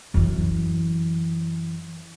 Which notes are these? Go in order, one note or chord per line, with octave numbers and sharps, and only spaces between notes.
F#2 E3